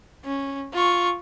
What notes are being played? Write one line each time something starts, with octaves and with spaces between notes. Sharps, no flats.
C#4
F4 C#6